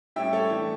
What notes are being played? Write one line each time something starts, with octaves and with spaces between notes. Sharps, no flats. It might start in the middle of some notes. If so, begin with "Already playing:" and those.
A2 G3 C#4 E5 G5
A4 C#5
E3 A3 D4